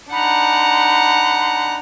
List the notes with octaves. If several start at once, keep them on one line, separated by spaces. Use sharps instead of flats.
D4 D#4 F#5 A#5 B5